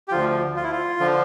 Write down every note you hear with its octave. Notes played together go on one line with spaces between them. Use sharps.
G4
D2 D3 F3 F4
F4
E4
F4
D3 F3